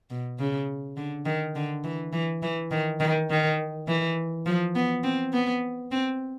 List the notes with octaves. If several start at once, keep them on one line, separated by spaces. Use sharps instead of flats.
B2
C#3
D3
D#3
D3
E3
E3
E3
D#3
D#3
D#3
E3
F3
B3
C4
B3
C4